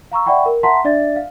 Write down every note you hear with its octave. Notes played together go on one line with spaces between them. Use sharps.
F5 A#5 C#6 E6
D5 E5 F#5 G5 B5 C#6
A#4
E5 F#5 A5 A#5 C6 B6
D4 D5 E5 A6
F5